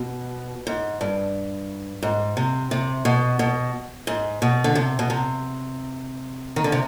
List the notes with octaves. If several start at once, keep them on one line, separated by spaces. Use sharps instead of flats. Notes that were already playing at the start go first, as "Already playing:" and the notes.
Already playing: B2
G#2
G2
G#2
C3
C3
B2
B2
G#2
B2
D3
C3
B2
C3
D#3
D3
C3